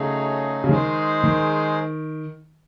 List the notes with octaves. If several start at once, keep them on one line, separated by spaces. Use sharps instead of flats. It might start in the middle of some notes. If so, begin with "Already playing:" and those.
Already playing: C#3 F#3 A3 D#4 G#4
C#3
D#3 G#3 D#4 G#4 C5
D#3